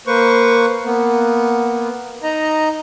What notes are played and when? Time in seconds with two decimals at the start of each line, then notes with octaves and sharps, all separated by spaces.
0.07 A#3 B4 C5 C#6
0.86 A#3 B3
2.23 D#4 D#5 A#5